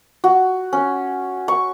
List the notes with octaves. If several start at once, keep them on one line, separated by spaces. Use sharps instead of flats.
F#4
C#4
C#6